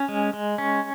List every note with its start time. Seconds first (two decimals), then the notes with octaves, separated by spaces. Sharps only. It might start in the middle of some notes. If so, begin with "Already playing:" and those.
Already playing: C#4
0.08 G#3
0.33 G#3
0.58 C#4